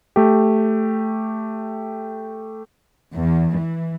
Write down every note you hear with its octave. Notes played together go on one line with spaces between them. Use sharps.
A3 G4
E2
E3